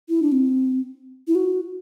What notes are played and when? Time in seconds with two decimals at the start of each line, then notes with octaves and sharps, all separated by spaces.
0.09 E4
0.22 D4
0.32 C4
1.28 E4
1.35 F#4